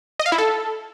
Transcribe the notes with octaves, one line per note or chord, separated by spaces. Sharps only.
D#5
F5
E4
A4